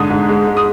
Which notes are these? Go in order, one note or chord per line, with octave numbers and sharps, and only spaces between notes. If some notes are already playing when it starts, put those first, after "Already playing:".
Already playing: G#2 D3 D#6
G#2
G#3
G#3
D#6